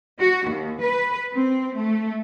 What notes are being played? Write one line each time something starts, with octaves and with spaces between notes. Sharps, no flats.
F#4
D#2
B4
C4
A3